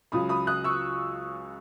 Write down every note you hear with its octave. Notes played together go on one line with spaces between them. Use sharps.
C#2 C#3 F#3 B5 D#6
B5 D#6
D#6 F#6
C#6 E6